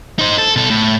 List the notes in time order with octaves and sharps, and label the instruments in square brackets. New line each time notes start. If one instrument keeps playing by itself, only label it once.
[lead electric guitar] D#4 C5
A4
B2 A4
A2